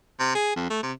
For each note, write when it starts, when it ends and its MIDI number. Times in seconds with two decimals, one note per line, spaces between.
0.20 0.33 48
0.35 0.55 68
0.56 0.65 41
0.70 0.81 57
0.83 0.92 48